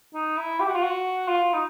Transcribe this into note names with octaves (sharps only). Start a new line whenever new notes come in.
D#4
E4
G4
F#4
F4
F#4
F4
D#4